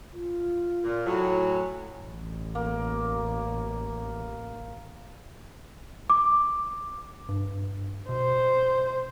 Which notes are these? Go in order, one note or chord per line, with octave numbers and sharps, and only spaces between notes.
F4
A#2
A2 F#3
G#5
A1
A#3
D6
G2
B2 C5